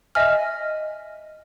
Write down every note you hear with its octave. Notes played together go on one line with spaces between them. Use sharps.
D#5 E5 G#5 F6